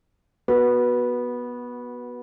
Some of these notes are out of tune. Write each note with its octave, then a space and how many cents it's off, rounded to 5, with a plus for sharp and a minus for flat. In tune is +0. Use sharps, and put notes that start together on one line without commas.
B3 -15 F#4 +0